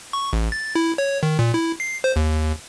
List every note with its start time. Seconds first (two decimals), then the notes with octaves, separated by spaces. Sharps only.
0.13 C#6
0.33 A1
0.52 A6
0.75 E4
0.98 C#5
1.23 D#3
1.39 A#2
1.54 E4
1.80 C7
2.04 C5
2.16 D#2